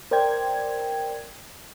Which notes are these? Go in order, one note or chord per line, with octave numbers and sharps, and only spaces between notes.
A#4 C5 D5 G5 G#6